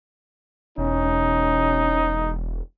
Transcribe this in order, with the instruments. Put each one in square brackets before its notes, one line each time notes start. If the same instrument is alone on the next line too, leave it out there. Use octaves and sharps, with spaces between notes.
[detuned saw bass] E1 [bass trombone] C#4 [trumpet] D#4